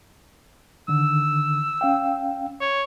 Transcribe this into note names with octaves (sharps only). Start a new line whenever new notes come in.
D3 D#3 E6
C#4 F5 G5
C#5